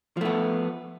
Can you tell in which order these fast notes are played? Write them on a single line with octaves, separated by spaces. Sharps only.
F3 A3 B3